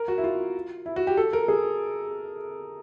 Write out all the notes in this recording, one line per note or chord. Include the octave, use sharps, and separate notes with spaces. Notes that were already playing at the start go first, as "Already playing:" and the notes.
Already playing: A#4
F#4
E4
F4
E4
F#4
G4
A4
A#4
G#4